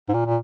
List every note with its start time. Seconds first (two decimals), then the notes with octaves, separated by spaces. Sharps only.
0.09 G#2
0.14 A#2
0.26 A#2